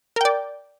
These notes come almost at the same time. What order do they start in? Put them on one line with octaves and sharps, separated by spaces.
A#4 G5 D5